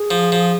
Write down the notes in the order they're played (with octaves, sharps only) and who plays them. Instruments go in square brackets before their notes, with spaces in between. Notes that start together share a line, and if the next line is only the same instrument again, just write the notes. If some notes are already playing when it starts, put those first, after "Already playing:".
Already playing: [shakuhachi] G#4
[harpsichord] F3
F3